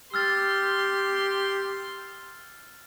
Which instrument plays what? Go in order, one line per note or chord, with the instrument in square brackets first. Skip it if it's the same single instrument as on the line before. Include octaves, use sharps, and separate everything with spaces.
[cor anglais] G4 [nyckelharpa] C6 [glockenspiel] E6 F6 A6